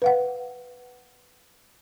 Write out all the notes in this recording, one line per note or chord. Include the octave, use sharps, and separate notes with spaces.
B4 F5 F#5